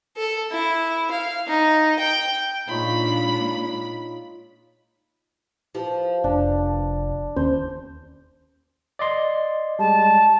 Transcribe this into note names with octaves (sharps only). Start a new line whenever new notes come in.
A4
E4
F5
D#4
G5
A#2 G#3 D4 D#4 F4 C#5 B5
F3 E4 G4 B4
F1 D4
D#2 C#4 C5
D5 D#5 C6
G3 G#3 A5